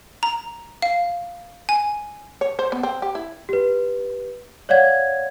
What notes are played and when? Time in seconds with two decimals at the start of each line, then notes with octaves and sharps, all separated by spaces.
0.23 A#5
0.82 F5
1.69 G#5
2.41 C#5
2.59 C5
2.72 B3
2.83 C4
3.02 G4
3.15 E4
3.49 G4 B4
4.69 C#5 D5 F5 F#5 G#6